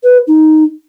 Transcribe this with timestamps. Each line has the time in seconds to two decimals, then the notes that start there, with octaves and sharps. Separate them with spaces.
0.04 B4
0.27 D#4